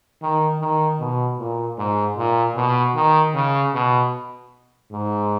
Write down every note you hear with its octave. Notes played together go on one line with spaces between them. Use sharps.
D#3
D#3
B2
A#2
G#2
A#2
B2
D#3
C#3
B2
G#2